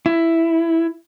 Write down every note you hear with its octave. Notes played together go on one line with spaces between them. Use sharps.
E4